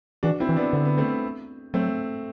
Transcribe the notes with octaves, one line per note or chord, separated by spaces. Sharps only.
E3 D4 F#4
C4 E4
E3
B3 D4
D3 C4
B3
A3 C4
F#3 A3 C4